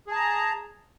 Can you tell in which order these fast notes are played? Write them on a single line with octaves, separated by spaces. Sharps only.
G#4 A5 A#5